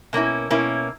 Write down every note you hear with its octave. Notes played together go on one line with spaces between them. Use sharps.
B2 A#3 C#4 E4
B2 A#3 C#4 E4